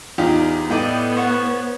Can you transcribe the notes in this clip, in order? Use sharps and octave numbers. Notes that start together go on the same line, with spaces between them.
E2 D#4 F4 G4
A2 B3 D5 D#5 G5
C5 C#5 F#5